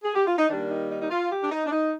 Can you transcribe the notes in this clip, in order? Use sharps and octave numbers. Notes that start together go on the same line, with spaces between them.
G#4
G4
F4
D#4
D#3 G3 A#3 D4
D#4
D#4
D#4
F4
G4
D4
D#4
D4
D#4